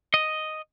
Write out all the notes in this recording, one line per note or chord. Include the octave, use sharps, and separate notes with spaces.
D#5